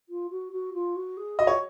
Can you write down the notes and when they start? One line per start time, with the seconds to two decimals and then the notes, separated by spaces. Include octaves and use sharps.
0.09 F4
0.30 F#4
0.52 F#4
0.73 F4
0.95 F#4
1.17 G#4
1.39 F#4 D#5
1.47 C#5